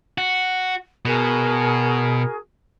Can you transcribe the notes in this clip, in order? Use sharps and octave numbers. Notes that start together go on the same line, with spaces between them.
F#4
B2 F#4 G#4 A#4